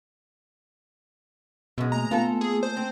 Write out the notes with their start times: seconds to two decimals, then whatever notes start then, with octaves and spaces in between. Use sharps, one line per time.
1.78 F#2 B2 G#3 D#5
1.92 A3 A#3 G#5 A#5
2.11 B3 F4 A4
2.41 G#4
2.63 C5
2.77 C4